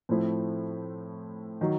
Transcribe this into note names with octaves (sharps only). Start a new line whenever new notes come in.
A2 F3 A3 C4 E4
D#3 F#3